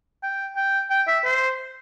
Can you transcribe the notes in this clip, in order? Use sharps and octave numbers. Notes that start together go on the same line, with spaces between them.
G5
G5
G5
E5
C5